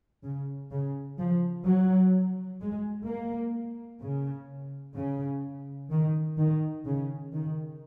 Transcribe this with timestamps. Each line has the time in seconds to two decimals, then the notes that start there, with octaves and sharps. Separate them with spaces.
0.23 C#3
0.71 C#3
1.19 F3
1.65 F#3
2.60 G#3
3.07 A#3
4.02 C#3
4.96 C#3
5.91 D#3
6.38 D#3
6.86 C#3
7.33 D#3